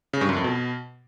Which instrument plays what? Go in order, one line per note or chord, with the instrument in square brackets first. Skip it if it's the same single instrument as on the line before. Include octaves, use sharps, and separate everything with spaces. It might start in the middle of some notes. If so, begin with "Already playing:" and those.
[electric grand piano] C#3
G2
F#2
F2
B2